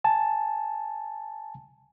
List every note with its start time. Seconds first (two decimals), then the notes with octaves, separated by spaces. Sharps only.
0.04 G#5 A5